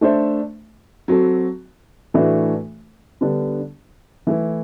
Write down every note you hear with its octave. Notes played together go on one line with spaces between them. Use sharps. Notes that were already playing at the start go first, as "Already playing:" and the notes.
A3 D4 A4 C5 E5
F#3 C4 F#4 A4
A2 E3 A3 D4 F#4
D3 G3 B3 D4
E3 A3 E4 A4